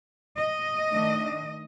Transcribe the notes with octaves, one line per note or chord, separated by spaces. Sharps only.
D#5
D#3 A3 D4